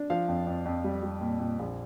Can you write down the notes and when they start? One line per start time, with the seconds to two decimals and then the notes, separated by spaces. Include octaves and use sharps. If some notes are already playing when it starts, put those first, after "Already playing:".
Already playing: D4
0.10 F3 F5
0.28 F2
0.47 F2
0.65 F2
0.84 G3
1.03 G3
1.21 A#2
1.40 A#2
1.59 A#1